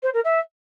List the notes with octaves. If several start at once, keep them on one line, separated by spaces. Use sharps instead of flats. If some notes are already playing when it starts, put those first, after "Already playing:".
C5
A#4
E5